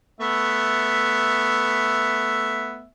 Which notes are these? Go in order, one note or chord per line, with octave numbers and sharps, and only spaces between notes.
A3 B3 E5